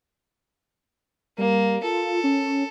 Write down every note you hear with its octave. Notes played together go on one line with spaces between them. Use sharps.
G3 A#3
F4 A4
C#4